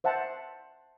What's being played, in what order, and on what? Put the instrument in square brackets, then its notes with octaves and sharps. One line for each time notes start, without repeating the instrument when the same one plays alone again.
[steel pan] C5 E5 F#5 A5